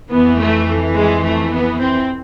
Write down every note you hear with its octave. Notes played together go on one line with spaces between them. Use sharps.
F2 E3 B3
A3
G#3
A3
B3
C4